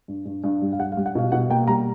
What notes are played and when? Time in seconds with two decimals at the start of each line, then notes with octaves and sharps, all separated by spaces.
0.08 G2
0.25 G2
0.44 G2
0.62 G3
0.72 F5
0.79 G3 F#5
0.92 F5
0.97 G3
1.06 F#5
1.15 B2 F5
1.32 B2 F#5
1.50 A#3 G5
1.67 G3 A#5